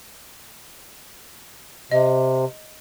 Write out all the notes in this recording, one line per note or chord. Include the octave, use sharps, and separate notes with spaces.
C3 D#5